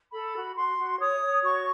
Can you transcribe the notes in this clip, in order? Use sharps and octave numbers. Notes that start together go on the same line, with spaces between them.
A4 B5
F#4
F#4 C6
F#4
C#5 D#6
C#5
F#4 C#6